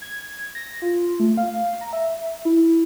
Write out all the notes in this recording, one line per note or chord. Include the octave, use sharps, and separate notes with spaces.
G#6
A#6
F4
A3
F5
A#5
E5
E4